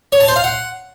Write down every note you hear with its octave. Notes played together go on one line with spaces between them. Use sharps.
C#5
A5
C5
F5
F#5